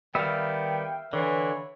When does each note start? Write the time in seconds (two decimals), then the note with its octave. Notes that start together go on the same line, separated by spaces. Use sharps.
0.15 D#3 G3 B3 E5 F5 G5
1.13 D3 E3 C#5